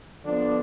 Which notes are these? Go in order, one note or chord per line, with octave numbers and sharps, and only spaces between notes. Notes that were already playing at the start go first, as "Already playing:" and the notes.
D3 F3 B3 D4